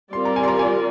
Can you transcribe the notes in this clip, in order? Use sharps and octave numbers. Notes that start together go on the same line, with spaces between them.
G3 C4 F4 A#4 D5 C6
A#5
G#5
C6
A#5
G#5